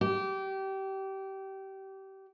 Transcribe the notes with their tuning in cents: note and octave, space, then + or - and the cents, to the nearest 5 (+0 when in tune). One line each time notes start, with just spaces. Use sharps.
G4 -25